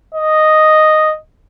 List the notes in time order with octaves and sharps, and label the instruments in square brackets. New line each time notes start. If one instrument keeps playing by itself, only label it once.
[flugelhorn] D#5